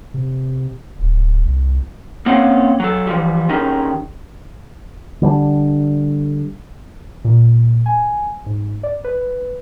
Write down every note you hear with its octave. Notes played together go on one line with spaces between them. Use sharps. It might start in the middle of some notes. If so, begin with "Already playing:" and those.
C3
D1
C2
A#3 C4 C#4 F5 F#5
F#3 A4
E3 F3 G3
D#3 C#4 D#4 G4 G#4 A#4
D3 G3 C4 D4
A#2
G#5
G#2
D5
B4